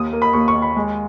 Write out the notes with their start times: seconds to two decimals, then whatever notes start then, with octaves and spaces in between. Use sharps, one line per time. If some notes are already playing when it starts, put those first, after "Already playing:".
Already playing: D#2 D#6
0.13 A#3
0.22 B5
0.33 D#2 C#6
0.48 C#6
0.55 D#2
0.62 B5
0.76 G#3